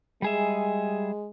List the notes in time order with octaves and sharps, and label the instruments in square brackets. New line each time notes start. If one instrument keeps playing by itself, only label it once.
[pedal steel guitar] G3 G#4 E5 [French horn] G#3